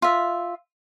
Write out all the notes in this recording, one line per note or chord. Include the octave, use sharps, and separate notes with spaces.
F4 E5